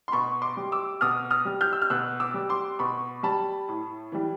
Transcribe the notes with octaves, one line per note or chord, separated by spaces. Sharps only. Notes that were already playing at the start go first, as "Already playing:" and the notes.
C6
B2 B5 C#6
C6 D6
G3
D6 E6
B2 D#6 F6
D#6 F6
G3
F6 G6
E6
F6
B2 E6 F#6
D6 E6
G3
C6 D6
B2 B5 C#6
G3 A5 B5
A2
E3 G3